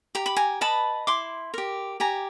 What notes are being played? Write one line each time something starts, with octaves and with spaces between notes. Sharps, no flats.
G4 A#5
B5
G#5 A#5
B4 D#5 A5 B5
E4 C6 D6
G4 A#4
G4 G#5 A#5